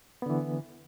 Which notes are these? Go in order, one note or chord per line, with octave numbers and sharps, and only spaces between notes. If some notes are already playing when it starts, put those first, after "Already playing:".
D3 E3 B3